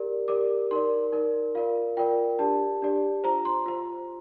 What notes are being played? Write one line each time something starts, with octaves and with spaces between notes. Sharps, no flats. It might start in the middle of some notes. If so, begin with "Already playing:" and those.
Already playing: G4 A#4 D5
G4 A#4 D5 D6
D#4 A#4 D5 C6
D#4 A#4 D5
F4 A#4 D5 F5
F4 A#4 D5 G5
D4 G4 D5 A5
D4 G4 D5
F4 C5 A#5
C6
F4 C5